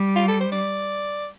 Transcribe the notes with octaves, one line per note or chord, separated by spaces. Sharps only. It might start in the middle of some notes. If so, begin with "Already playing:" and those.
Already playing: G3
F4
A4
C5
D5